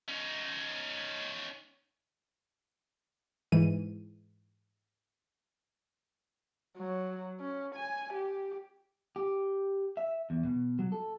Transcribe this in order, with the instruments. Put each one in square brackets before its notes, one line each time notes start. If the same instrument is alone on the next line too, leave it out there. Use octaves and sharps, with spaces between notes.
[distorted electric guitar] C#4 D#4
[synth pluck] G#2 E3 D#7
[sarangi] F#3
C#4
G#5
G4
[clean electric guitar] G4
E5
E2
B2
F#3
A4